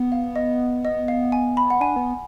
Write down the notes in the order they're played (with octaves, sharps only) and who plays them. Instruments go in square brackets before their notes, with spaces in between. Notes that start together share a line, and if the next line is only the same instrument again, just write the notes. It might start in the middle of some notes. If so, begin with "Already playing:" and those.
Already playing: [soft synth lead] B3
[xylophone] F5
D#5
D#5
F5
G#5
B5
F#5
[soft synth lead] D4 [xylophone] G#5
[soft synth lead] B3